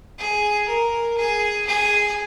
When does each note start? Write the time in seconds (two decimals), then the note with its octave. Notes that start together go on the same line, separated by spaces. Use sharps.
0.19 G#4
0.68 A#4
1.18 G#4
1.67 G#4